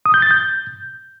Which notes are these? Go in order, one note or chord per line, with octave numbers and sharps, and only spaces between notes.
D#6
G6
A6
G6